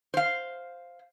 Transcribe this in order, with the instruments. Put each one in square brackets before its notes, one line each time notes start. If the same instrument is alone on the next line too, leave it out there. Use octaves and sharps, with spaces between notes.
[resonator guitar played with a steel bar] C5 F5